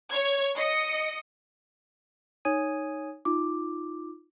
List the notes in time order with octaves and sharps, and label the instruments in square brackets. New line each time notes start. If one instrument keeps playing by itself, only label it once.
[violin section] C#5 G#6
D#5 C#7
[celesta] D#4 C#5 G#5 D#6 G#6 D#7
D#4 F4 D6